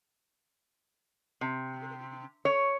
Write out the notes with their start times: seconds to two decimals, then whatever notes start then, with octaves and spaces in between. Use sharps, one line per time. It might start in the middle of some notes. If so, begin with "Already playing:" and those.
1.41 C3
2.45 C#5